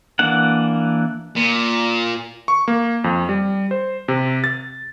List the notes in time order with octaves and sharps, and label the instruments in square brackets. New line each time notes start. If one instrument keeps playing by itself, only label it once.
[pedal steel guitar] E3 A#3 D4 F#5
[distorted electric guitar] A#2
[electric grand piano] C#6
A#3
F2
G3
C5
C3
A6